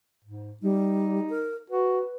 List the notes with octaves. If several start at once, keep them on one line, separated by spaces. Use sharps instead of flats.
G#2
G3 D#4
A#4
F#4 B4